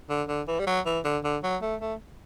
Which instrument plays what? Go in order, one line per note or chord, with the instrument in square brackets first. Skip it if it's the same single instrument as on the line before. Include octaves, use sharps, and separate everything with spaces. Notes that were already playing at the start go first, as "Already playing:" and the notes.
[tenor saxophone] D3
D3
E3
G3
F#3
E3
D3
D3
F#3
A3
A3